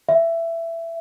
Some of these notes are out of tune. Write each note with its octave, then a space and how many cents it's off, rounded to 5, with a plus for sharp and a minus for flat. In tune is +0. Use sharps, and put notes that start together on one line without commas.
E5 +15